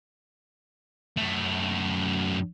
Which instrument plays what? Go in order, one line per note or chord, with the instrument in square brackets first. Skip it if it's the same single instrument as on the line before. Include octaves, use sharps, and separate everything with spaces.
[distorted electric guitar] F#2 A3